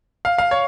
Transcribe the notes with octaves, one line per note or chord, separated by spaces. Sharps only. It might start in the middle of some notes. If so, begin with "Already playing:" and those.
F5
F5
C#5